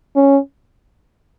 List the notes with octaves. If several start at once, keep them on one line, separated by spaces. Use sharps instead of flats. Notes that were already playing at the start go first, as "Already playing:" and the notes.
C#4